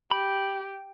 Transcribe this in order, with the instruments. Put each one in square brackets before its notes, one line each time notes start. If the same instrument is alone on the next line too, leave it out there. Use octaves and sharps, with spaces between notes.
[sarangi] G4 [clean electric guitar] B5